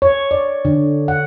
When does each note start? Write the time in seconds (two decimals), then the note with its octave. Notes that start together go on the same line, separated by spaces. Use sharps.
0.02 C#5
0.31 D5
0.65 D3
1.08 F#5